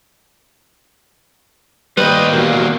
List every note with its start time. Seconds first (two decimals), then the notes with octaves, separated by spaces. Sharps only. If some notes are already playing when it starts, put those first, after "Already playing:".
1.97 D#2 G3 D#4 B4 C5 D5 D#5 G5
2.32 E2 A#2 F#3 A#3 F#4 G4